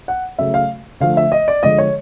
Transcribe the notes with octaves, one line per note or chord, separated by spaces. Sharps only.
F#5
C#3 F#3 A3 E5
F5
D3 F3 A3 F5
E5
D#5
D5
D3 F3 G#3 D#5
C#5